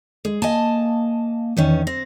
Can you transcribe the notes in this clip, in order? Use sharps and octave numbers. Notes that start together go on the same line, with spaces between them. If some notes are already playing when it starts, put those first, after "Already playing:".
G#3 G#4
A#3 D#5 G#5 A5
E2 D#3 E3 C#4
C4 A#6